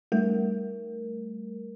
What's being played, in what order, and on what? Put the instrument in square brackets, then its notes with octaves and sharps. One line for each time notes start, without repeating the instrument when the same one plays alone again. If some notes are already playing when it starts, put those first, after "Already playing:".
[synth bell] G3 A3 A#4